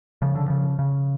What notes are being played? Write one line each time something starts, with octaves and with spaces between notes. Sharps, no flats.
C#3 F3
D3
C#3 F3
C#3